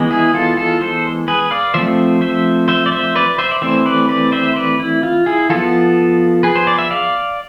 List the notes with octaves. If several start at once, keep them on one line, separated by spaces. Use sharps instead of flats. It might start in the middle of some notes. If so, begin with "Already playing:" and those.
Already playing: E3 G#3 B3
E4 G#4
F4 A4
F4 A4
A4 C5
G#4 B4
D5 F5
F3 A3 C4 C5 E5
C5 E5
C5 E5
D5
C5 E5
B4 D5
C5 E5
D5
E3 A3 C4 C5 E5
B4 D5
B4 D5
C5 E5
B4 D5
E4
F4
E4 G#4
F3 B3 F4 A4
G#4 B4
C5
D5
E5
D5 F5